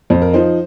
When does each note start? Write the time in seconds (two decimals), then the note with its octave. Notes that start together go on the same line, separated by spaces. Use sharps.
0.10 F2 C5
0.22 A#4
0.33 F3 D#4 C5